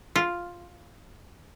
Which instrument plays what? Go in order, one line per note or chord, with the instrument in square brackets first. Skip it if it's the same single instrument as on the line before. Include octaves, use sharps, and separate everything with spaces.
[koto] F4